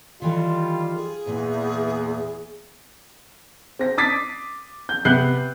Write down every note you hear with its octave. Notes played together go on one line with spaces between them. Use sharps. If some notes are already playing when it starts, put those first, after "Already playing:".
D#3 E3 G3 F4 A4
G#4
E2 A#2
C4 A#6
D6 D#6 A6 B6 C7
G6
C3 B3 F#6 G6 C7